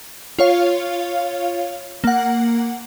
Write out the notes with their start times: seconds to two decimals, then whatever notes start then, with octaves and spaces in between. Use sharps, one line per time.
0.39 F4 C#5 F5
2.04 A#3 F#5